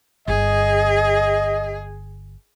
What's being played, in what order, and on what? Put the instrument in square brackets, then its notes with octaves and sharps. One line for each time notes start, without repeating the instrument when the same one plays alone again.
[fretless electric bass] G1 [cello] G#4 [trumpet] D#5